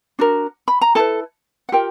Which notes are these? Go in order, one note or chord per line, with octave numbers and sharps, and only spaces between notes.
D4 F#4 A#4
B5
A#5
E4 G#4 A4 B4 A5
F#5
F4 G4 A#4 G5